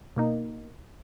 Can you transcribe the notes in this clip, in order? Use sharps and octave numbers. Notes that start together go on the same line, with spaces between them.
B2 A#3 D#4